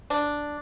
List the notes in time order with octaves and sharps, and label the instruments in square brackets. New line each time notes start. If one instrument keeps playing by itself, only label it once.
[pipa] D4